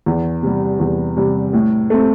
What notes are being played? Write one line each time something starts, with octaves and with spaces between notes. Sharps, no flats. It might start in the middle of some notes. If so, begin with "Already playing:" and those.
E2
C3 G3
E2
C3 G3
A2
A3 C4